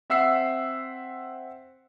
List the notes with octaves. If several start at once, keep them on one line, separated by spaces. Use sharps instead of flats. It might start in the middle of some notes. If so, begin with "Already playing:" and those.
C4 E5 F#5 E6 C7